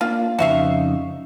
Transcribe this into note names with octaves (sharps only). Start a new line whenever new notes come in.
A#3 D4 F4
F2 C#3 D#4 F#4 E5 F5